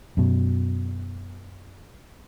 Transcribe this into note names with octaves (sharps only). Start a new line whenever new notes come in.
F#2 B2